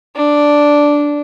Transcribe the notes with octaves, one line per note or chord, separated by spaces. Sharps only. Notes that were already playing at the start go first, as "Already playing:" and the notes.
D4